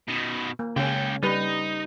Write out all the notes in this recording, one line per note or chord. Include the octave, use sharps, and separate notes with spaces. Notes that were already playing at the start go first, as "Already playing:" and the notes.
B2 D#3
A#3
C#2 C#3 C#4 G5
G3 D#4 B4